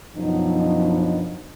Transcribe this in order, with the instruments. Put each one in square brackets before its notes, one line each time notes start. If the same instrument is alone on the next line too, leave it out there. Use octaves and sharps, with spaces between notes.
[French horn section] F#2 B2 F3 F#3 D4 D#4